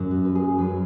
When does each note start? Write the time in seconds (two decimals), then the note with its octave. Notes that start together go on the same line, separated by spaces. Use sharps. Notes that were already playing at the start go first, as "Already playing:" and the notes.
Already playing: F#2 F#3 C#4
0.11 F#4
0.25 B4
0.35 G#4
0.58 F#2 F#3 C#4 B4